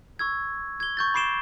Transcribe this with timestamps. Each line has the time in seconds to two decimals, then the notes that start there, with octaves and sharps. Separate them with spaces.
0.19 C#6 E6 G#6
0.80 G#6 G7
0.97 C#6 G6 A6
1.14 B5 D6 C7 D7 E7 G7